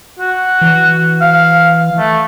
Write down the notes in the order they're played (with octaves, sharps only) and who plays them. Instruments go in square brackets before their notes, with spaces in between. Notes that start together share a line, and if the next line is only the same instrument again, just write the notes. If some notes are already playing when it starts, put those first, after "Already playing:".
[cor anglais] F#4
[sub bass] E3
[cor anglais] F5
A3